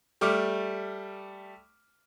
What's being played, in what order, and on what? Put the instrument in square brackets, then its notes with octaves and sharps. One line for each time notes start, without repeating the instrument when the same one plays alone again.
[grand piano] G3 A3 D6 F6